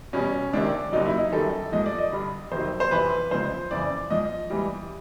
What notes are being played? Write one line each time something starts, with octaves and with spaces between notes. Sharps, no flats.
E2 B2 G3 C#4
C#2 C3 D#3 D4
D#2 C#3 F#3 D#4
E4
D#4
F#2 D#3 G3 A4
G#2 F3 D#5
D5
D#5
G2 D3 G3
F2 C3 D#3 F#3 C5
C5
F2 C3 E3 B4
C#2 C#3 F3 C5
F2 C#3 E3 D5
G#2 F3 D#5
G#2 E3 G3